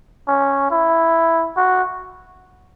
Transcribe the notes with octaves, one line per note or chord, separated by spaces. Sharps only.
C#4
E4
F#4